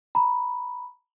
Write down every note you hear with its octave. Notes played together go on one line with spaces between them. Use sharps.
A#5 B5